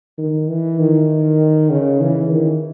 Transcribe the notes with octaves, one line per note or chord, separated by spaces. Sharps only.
D#3
E3
D#3
C#3
E3
D#3